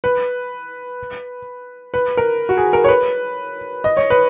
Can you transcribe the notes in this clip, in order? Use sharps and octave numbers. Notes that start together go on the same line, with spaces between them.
B4
B4
A#4
F#4
G#4
A#4
C#5
B4
D#5
C#5
B4